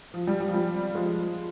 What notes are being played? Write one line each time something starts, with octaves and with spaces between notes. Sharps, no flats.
F3
G3
G3
F3
G3
F3 G#3